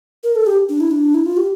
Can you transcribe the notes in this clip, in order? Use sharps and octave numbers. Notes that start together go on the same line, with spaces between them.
A#4
A4
G4
D4
E4
D4
E4
F4
G4